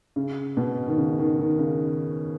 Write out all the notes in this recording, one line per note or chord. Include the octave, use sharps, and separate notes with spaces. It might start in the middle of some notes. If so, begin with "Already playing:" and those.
C#3
B2
D#3
C#3
D#3
D#3
C#3